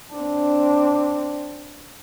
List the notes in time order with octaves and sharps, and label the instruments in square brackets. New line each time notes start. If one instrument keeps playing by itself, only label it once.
[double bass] C4 D4